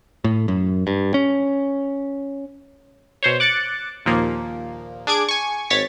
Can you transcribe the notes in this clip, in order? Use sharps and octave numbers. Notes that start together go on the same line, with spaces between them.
A2
F#2
G2
C#4
B2 C5 C#5
D6 F#6 A6 C#7
D#2 A#2 F3 A#3
D4 G#4 D6 G#6 D7
G#5 C#6
G#1 C#5 A6 B6